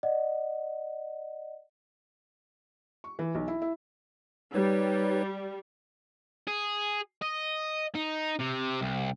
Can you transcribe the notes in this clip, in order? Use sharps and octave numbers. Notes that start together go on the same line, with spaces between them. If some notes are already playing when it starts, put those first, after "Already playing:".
D5 D#5 F#5
C#6
E3
B1
E4
E4
G3 D#4 B4 C#5
G#4
D#5
D#4
C3
C2